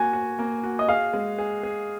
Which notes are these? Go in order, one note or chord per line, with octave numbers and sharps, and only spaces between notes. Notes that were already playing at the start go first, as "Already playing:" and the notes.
Already playing: A#3 F#4 G#5
F#4
A#3
F#4
D#5
G#4 F5
G#3
G#4
G#4